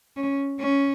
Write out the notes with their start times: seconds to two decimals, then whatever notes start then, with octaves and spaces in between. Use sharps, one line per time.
0.16 C#4
0.60 C#4